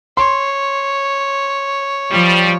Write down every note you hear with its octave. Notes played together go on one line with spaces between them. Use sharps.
C#5 C6
F3 G3